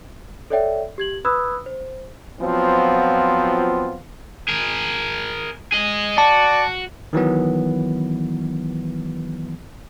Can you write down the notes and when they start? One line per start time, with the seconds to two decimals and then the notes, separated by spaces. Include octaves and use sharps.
0.50 A4 C#5 D5 E5 G5
0.98 G4 G#6 F#7
1.25 B4 B5 D#6 E6 F#6 G#6
1.66 C5
2.41 F3 F#3 B3 C4 F4
4.48 G#4 A#4
5.72 G#4 D#5
6.18 F#4 D5 A5
7.13 D#3 E3 F#3 B3